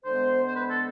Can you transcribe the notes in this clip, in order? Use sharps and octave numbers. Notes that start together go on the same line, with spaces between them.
D3 G#3 B3 C5
C5
B4
A4